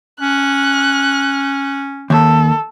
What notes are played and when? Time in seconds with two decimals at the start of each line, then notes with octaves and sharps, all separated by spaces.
0.21 C#4 F#6
2.10 D#2 A4